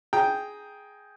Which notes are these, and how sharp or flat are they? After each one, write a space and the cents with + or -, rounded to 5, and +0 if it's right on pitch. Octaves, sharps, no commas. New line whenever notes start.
G#4 +5 G5 +0 A#5 +0